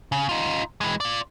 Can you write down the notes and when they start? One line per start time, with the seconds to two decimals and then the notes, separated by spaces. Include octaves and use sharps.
0.12 C#3
0.29 D#4 F4
0.81 E3 G#3
1.00 F4 D5